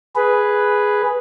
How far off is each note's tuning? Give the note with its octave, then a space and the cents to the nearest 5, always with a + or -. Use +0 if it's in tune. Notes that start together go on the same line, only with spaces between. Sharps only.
G#4 +0 B4 +0